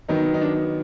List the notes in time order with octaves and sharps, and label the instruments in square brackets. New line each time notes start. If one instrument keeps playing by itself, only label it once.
[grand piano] D#3 F#3 B3 D#4
D#4
D4